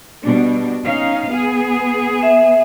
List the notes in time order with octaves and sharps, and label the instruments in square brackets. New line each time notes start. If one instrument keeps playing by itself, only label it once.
[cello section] B2 G3 D4
C#4 D#4 F5
B3 G#4
[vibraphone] E5